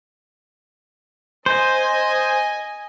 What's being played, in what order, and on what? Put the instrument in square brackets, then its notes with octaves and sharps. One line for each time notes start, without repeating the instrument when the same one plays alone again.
[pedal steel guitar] C5 [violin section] D#5 G#5